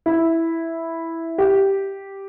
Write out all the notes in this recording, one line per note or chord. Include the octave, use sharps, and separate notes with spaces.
E4
G4